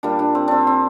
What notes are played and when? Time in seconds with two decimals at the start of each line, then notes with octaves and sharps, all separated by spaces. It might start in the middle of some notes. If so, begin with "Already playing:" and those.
0.03 A#2 G3 D4
0.19 D4
0.35 C4
0.48 C4 D4
0.67 C4